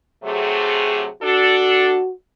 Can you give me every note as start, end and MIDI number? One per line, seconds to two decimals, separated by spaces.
0.24 1.06 48
0.24 1.06 54
0.24 1.06 57
0.24 1.12 68
1.23 1.99 62
1.23 2.11 66
1.23 1.99 69